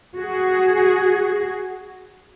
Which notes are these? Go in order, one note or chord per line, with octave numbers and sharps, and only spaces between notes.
F#4 G#4